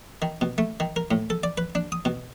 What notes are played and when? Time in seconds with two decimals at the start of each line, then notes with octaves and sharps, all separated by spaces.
0.22 D#3
0.41 B2
0.58 A3
0.80 D#3
0.96 A#4
1.11 A2
1.30 A4
1.43 D5
1.58 B4
1.75 D4
1.92 D#6
2.05 B2